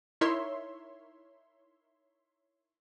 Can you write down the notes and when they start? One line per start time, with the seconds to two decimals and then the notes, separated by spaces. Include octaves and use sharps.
0.21 D#4 E4 A#4 C#5 E5 C6